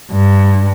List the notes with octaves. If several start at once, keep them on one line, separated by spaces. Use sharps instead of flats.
G2